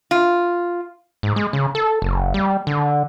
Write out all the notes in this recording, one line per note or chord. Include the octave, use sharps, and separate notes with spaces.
F4
G#2
G#3
C#3
A4
F#1
G3
D3